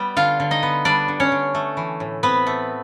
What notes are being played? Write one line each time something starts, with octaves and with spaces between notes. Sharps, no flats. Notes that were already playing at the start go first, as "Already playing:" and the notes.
Already playing: G3 B3
D3 F4 F5
D3
D#4 D#5
B3
G3 D4 D5
D3
C#4 C#5
D3
A3
E3
A2
B3 C4 B4
A3